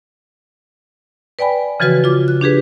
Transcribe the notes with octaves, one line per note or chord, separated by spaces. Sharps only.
B4 D5 G5 G#5 B5
C#3 E3 F3 F#4 B4 F6
F4 D6
F#6
D4 G4 G#4 B4